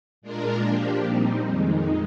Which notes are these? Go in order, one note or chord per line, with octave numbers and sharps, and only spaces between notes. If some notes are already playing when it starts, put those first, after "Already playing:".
A#2 G#3 D4 F4 A#4
F3 A#3 D4 G4
A#2 G3 C4 D#4
F2 D#3 G#3 D#4